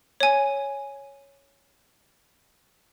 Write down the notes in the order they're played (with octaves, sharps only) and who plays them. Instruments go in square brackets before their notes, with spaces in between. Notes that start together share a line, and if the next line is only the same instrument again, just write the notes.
[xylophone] C#5 G#5